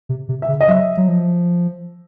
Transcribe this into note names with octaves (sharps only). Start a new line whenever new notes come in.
C3
C3
E5
C#3
D#5
F#3 E5
F#3
F3